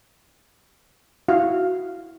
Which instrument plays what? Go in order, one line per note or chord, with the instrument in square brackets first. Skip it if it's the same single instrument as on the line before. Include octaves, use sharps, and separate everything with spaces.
[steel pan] E4 F#4 F5